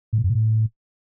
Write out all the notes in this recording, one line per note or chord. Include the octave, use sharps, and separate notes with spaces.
A2
A#2
F#2
A#2
A2